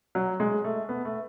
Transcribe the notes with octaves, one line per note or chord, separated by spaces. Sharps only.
F#3
G#3
A3
B3
A3